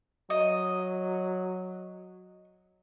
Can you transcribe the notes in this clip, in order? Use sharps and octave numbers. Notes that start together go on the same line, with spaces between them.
F#3 D#5